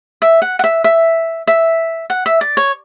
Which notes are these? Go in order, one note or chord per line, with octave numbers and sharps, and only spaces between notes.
E5
F#5
F#5
E5
E5
E5
F#5
E5
D5
C#5